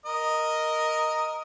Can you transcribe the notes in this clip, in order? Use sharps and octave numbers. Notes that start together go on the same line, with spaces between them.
A#4 D#5